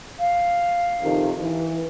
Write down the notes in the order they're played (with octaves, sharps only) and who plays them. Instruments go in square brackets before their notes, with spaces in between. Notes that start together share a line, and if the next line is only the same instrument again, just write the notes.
[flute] F5
[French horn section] F2 C3 D#3
E3